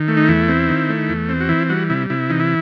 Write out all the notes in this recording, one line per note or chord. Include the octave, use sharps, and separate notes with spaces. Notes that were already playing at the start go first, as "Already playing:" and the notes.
Already playing: D#3
A3
D#4
E2 E4
C4
D#3
A3
E2
C4
F#4
E3 E4
G3 F#4
C3 E4
C3 E4
E3 D#4
E4